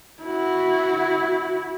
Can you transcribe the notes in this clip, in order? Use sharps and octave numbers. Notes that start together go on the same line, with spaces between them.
E4 F#4